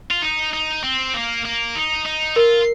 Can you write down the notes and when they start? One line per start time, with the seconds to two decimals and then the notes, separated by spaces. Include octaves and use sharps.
0.11 F4
0.22 D#4
0.53 D#4
0.83 C4
1.14 A#3
1.45 A#3
1.76 D#4
2.06 D#4
2.36 F4 A#4